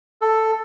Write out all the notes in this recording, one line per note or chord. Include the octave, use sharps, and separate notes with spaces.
A4